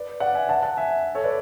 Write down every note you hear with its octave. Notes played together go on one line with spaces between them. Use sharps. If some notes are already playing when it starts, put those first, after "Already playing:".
Already playing: B4 D5
D5 F#5
E5 G#5
F#5 A5
F#5 A5
E5 G#5
A4 C#5
B4 D5